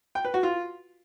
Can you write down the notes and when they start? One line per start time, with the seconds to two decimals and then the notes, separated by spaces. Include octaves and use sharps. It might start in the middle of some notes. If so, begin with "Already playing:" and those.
0.15 G5
0.25 B4
0.34 F#4
0.43 F4